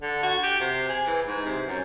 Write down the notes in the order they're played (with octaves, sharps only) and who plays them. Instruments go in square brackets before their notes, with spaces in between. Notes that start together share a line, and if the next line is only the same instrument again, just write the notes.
[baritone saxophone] D3
F#4
G4
C3
G#4
E3
G#2
C3
F#2